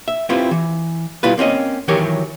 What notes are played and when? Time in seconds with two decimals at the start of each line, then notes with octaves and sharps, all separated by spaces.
0.08 E5
0.29 C4 E4 F4 G4 B4
0.51 E3
1.23 B2 G3 E4 F4 B4
1.38 A#3 C4 C#4 D#5
1.88 D#3 E3 F#3 G4 A#4 C#5